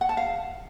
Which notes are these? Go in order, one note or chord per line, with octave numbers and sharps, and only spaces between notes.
F#5
A5
F5